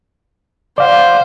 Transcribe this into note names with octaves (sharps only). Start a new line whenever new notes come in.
C5 D5 F5 F#5